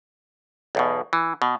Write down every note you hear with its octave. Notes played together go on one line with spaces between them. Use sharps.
B1 E2 B2
E3
B2